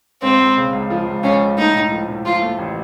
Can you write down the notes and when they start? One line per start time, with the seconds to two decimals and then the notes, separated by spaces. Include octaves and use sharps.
0.22 C#2 C4
0.39 C#2
0.57 C#3
0.73 C#2
0.90 F3
1.07 C#2
1.23 C#2 C#4
1.41 C#2
1.57 A3 D#4
1.74 A2
1.92 F3
2.08 A2
2.26 F3 F4
2.41 A3
2.59 A1